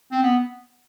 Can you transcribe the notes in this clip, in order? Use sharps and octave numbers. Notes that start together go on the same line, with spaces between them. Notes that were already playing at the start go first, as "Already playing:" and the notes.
C4
B3